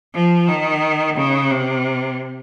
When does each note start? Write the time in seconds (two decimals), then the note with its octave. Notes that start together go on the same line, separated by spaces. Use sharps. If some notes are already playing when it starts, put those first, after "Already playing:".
0.14 F3
0.48 D#3
1.17 C#3
1.51 C3